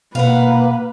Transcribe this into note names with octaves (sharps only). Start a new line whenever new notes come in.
B2 A#3 B4 F5 F#5